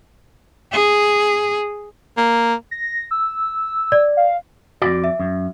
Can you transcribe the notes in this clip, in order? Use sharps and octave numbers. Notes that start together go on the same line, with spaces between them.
G#4
A#3
A#6
E6
D5
F5
F2 A#2 F#4 D5
E5
F#2